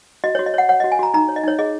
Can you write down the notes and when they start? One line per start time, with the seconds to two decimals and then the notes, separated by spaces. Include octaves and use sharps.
0.24 F#4 D#5
0.35 F#4 C#5
0.46 D#5
0.54 C#5 F#5
0.69 C#5 F#5
0.80 F#4 D#5
0.92 G#5
0.99 F#4 A#5
1.14 D#4 A#5
1.29 C#5
1.36 D#5
1.44 D#4 C#5
1.59 G#4 D#5